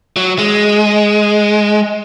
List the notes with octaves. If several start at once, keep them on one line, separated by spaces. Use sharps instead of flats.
F#3
G#3